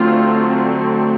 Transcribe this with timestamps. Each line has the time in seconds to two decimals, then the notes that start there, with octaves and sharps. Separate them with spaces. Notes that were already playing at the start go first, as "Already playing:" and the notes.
Already playing: D3 F#3 A3 C4 F4